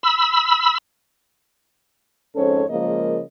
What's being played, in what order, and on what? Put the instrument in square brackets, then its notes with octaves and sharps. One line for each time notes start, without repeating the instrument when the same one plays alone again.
[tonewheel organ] B5 E6
[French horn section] F2 G#2 C#4 A4 C5 C#5
C#3 F3 G#3 A#3 A#4 D#5